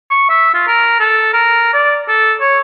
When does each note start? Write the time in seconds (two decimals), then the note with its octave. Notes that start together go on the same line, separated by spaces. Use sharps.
0.10 C#6
0.30 E5
0.54 F4
0.68 A#4
1.00 A4
1.33 A#4
1.73 D5
2.08 A4
2.41 C#5